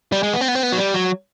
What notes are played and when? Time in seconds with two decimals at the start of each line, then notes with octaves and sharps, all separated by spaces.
0.12 G3
0.23 G#3
0.34 B3
0.41 C4
0.48 B3
0.55 C4
0.63 B3
0.72 F#3
0.77 G3
0.94 F#3